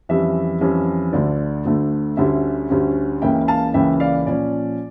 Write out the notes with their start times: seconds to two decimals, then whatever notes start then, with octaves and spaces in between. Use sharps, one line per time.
0.09 F2 E3 G3 C#4 E5
0.61 F2 E3 G3 C#4
1.13 D2 D3 A3 D5
1.65 D2 D3 A3
2.17 D2 D3 G3 C#4 E5
2.70 D2 D3 G3 C#4
3.22 C#2 C#3 E3 A#3 C#4 E5 G5
3.48 F5 A5
3.74 C#2 C#3 E3 A#3 C#4 E5 G5
4.00 D5 F5
4.26 A#2 F3 C#4 D5